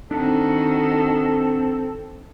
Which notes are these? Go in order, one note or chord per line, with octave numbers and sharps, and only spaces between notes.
D#3 C4 D4 F#4 A4